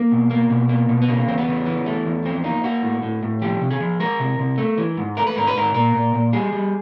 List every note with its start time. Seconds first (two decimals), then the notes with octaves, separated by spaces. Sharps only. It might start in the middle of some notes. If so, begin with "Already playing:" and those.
Already playing: A#3
0.12 B2
0.31 A#3
0.50 B2
0.69 A#3
0.89 B2
1.02 B3
1.08 C#3 A#3
1.28 E2 C4
1.38 B3
1.48 C#3
1.66 E3
1.86 A3
2.06 E2
2.25 F3 C4
2.44 A#3 D#4
2.64 A#3 F#4
2.83 A2
3.03 A2
3.23 A2
3.42 F3 G4
3.61 C3
3.71 G#4
3.80 F3
4.00 G#3 A#4
4.19 C3
4.39 C3
4.58 A3
4.78 E3
4.97 G#2
5.17 A3 A#4
5.27 B4
5.36 G#2 A#4
5.47 B4
5.55 G#2 A#4
5.74 A#2 A#4
5.95 A#2
6.14 A#2
6.33 G3 G#4
6.52 G3